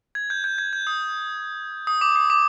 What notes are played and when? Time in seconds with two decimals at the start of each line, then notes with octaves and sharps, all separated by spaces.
0.15 G#6
0.30 G6
0.44 G6
0.58 G#6
0.73 G6
0.87 D#6
1.87 D#6
2.01 D6
2.16 D#6
2.30 D6